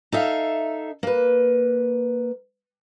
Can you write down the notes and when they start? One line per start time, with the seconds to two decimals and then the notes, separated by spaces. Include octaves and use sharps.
0.12 D#4 A4 E5 F5
1.03 A#3 B4